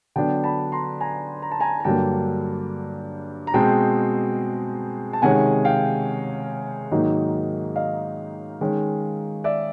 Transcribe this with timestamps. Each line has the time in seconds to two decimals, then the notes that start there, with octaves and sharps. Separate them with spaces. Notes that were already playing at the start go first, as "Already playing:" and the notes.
0.16 D3 F#3 B3 D4 G5 A5
0.44 A5 B5
0.72 A#5 C6
1.01 G#5 A#5
1.42 A#5
1.52 A5
1.60 G#5 A#5
1.80 A#5
1.84 G2 D3 F#3 A#3 G5 A5
3.47 A#5
3.54 B2 G#3 C4 G5 A5
5.13 A5
5.22 C3 D#3 G#3 C#4 F#5 G#5
5.65 F5 G5
6.92 G#2 D#3 F#3 A#3 D#4
7.76 D#5 F5
8.61 D#3 G#3 C#4
9.44 D5 E5